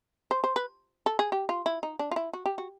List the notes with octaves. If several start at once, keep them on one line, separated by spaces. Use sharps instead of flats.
C5
C5
B4
A4
G#4
G4
F4
E4
D#4
D4
F4
E4
F#4
G4
F#4